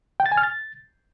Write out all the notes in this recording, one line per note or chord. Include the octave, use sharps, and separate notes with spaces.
G5
A6
G#5
F6
A6